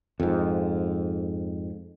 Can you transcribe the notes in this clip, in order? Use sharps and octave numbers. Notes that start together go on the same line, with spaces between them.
F2 G#2